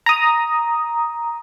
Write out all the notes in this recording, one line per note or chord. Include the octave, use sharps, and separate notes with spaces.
A#5 D#6